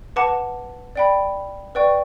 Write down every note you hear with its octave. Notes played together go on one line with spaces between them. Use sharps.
B4 F#5 A5 D6
D5 G5 B5
B4 D5 G5 C#6